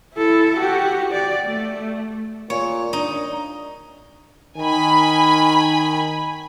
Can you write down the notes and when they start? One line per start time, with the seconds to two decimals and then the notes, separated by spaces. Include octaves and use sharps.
0.15 E4 A4
0.56 F#4 G4
1.12 D5
1.44 A3
2.50 A#2 C#5
2.93 D4 D#4
4.57 D#3 G#5 B5